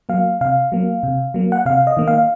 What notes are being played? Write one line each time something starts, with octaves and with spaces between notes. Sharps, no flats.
F#3 A#3 F5
C3 F5
F#3 A#3
C3
F#3 A#3
F#5
C3 F5
D#5
D#3 A#3
F5